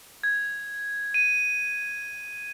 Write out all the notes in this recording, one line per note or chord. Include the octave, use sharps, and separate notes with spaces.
G#6
D#7